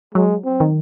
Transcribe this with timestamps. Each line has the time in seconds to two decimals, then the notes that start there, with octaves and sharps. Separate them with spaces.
0.14 F#3 G#3
0.45 C4
0.60 D#3